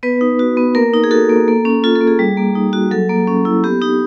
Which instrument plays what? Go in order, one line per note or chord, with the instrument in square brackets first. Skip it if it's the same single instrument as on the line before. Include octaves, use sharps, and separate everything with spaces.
[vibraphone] B3 B4
D#4
F#4
B3
A#3 A#4
D#4
G#4
F#4 A4
A#3
A#3
C#4
F4 A4
A4
A#3
G#4
G3
A#3
D#4
F#4
F#3 A4
A#3
C#4
E4
B3 G4
D#4 G4